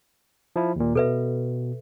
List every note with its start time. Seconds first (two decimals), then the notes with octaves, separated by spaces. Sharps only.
0.56 F3 E4
0.76 D#2 A#2
0.95 B2 A4 B4 E5